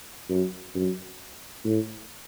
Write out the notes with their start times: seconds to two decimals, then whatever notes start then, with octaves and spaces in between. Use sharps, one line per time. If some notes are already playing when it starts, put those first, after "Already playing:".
0.30 F#2
0.75 F#2
1.64 A2